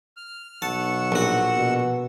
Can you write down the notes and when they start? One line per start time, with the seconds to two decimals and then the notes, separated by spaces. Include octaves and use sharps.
0.17 F6
0.62 B1 F#5 A5 C#6 E6
1.12 A#1 F#4
1.55 B2